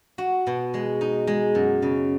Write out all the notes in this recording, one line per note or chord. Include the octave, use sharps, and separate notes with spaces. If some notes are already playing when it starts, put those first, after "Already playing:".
F#4
B2
G#3
D#4
G#3
F#2
C#3